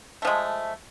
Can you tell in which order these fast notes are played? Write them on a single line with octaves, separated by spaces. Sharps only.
A3 F3 G#3